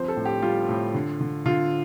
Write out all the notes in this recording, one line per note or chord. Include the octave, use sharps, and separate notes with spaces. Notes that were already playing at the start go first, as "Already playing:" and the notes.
Already playing: G1 F3 C4 C5
A4
A2
G4
G3 F4
A2
D3
D3
D3 F4